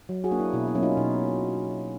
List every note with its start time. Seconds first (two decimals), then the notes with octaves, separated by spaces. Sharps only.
0.09 F#3
0.24 F#4 G#4
0.31 A#3 D4
0.39 E4
0.53 B2 E4
0.68 E4
0.75 F#3 A#3 C#4
0.83 D#4 F4
0.97 B2 D#4